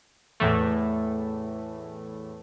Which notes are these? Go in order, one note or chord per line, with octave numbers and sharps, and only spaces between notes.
E2 A2 E3 A3